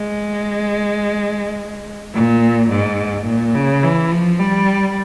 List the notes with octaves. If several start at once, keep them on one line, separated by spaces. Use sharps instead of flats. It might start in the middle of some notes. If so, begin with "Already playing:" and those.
Already playing: G#3
A#2
G#2
A#2
C#3
E3
F3
G3